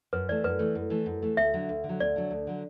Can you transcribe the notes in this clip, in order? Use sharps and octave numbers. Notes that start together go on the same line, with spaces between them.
F#2 B4
E3 A3 D5
F#2 B4
E3 A3
F#2
E3 A3
F#2
E3 A3
D2 E5
D3 F#3
D2
D3
F#3
D2 D5
D3 F#3
D2
D3 F#3